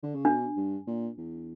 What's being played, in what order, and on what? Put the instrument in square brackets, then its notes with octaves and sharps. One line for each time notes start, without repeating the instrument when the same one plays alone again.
[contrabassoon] D3
C#3
[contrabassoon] B2 [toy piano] D4
[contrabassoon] G2
A#2
E2